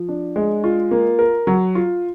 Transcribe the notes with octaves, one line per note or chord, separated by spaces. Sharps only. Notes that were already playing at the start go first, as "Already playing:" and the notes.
Already playing: F3
D4
G#3
F4
A#3
A#4
F#3
F4